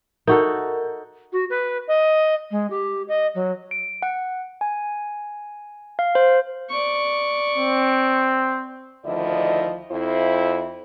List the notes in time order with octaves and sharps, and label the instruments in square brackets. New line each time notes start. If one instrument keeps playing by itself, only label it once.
[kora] D#4 F#4 A4 [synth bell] A#4
[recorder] F#4
B4
D#5
G#3
G4
D#5
F#3
[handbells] D7
F#5
G#5
F5
C5
[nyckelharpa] D5 C#6
[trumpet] C4
[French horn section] D2 D#3 F3 E4 D5 D#5
F2 E4 C5